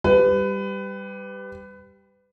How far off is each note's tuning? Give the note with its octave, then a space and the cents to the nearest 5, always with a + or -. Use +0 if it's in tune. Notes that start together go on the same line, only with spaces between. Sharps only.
G3 +5 B4 +25